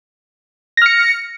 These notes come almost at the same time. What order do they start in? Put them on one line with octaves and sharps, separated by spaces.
A#6 F6 C#7